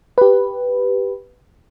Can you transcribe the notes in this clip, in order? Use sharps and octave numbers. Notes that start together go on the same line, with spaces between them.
G4 B4